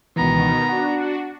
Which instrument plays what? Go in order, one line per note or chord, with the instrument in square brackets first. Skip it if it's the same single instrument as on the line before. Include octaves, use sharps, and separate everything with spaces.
[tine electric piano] C#2 E3 [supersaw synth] B2 D#3 [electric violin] B3 A#5
[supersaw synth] D4 F#4 [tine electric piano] F#5